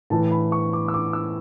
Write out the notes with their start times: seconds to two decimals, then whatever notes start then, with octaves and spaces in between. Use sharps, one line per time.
0.10 A2 E3 A5
0.31 B5
0.52 C#6
0.73 D6
0.88 E6
0.94 D6
1.13 E6